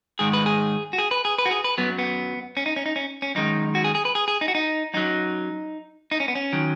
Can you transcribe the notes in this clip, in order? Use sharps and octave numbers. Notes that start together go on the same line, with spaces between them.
G#2 D#3 G#3 G#4
B4
G#4
F#4
G#4
B4
G#4
B4
F#4
G#4
B4
F#2 F#3 B3
B3
C#4
D#4
C#4
D#4
C#4
C#4
F#2 D#3 G#3 D#4
F#4
G#4
G#4
B4
G#4
G#4
D#4
F#4
D#4
F#2 F#3 D#4
D#4
C#4
B3
C#4
D#3 F#3